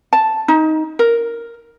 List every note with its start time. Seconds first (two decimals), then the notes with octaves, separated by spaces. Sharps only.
0.13 A5
0.48 D#4
0.99 A#4